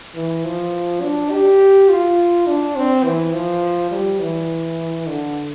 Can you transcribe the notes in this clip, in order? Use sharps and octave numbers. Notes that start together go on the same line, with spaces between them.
E3
F3
D4
G4
F4
D4
C4
E3
F3
G3
E3
D3